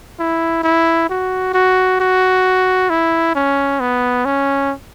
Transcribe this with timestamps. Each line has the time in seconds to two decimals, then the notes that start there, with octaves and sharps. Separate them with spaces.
0.19 E4
0.63 E4
1.10 F#4
1.54 F#4
2.00 F#4
2.90 E4
3.35 C#4
3.80 B3
4.25 C#4